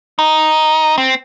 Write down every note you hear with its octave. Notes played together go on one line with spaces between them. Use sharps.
D#4
C4